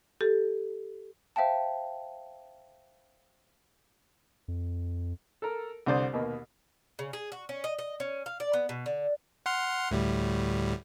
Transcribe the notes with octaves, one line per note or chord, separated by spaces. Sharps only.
G4 A4
C5 E5 F5 G5 A5
F2
A4 A#4
C2 D3 C5 D5 D#6
D#2 B2 A#3
C#3
G#4
F#4
C#4
D#5
D#5
C#4
F5
D5
B3
B2
D3
F#5 C6 F6
D2 A2 G3